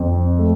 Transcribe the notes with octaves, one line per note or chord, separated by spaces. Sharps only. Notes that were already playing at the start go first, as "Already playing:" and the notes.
Already playing: F2
A3